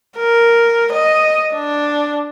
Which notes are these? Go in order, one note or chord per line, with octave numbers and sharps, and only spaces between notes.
A#4
D#5
D4